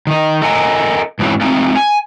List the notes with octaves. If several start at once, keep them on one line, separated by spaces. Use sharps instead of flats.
D#3 D#4
A4 A#4 D#5 F#5 G#5
G#2 E3 F#3 C4 C#4
G#3 A3 C4 D#4 F4
G#5